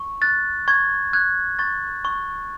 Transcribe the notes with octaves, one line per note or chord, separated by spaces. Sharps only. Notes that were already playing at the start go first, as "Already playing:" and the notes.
Already playing: C#6
F#6 A6
C#6 G#6
F#6 G#6
C#6 A6
C#6